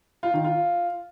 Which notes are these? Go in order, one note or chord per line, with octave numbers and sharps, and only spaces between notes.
F4
D#3
F4